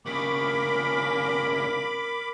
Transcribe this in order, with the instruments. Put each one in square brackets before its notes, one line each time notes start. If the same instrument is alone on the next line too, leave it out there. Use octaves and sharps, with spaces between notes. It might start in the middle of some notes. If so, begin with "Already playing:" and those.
[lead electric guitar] D#2 C#3 [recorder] A#4 [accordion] B5 D6